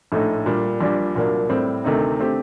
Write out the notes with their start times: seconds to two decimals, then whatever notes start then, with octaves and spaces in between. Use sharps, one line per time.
0.12 A#1 A2 A3 D#4
0.46 A#2 G3 D4
0.81 A#1 A#2 G3 D4 G4
1.15 C2 A#2 F#3 A#3 D4
1.49 A2 G3 C4
1.84 D2 C3 D#3 A3 D#4
2.19 D3 A3 C4 G4